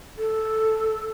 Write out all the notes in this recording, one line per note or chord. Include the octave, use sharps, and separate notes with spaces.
A4